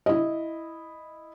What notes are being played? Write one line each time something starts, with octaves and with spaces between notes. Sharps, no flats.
E4 D#5